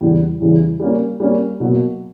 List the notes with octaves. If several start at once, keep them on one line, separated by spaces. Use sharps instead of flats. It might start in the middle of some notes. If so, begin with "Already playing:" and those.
E2 C#3 E3 G3
E2 C#3 E3 G3
G3 A#3 C#4
G3 A#3 C#4
B2 F#3 A#3